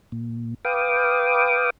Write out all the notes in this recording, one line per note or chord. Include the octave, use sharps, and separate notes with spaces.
A#2
B4 F5 G5 D6 D#6